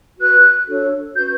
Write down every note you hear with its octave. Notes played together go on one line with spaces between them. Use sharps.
F#4 B4 F#6
D4 F#4 A4 C#5
C#4 F#4 B4 G6